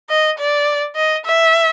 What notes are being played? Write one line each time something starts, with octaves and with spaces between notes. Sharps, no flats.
D#5
D5
D#5
E5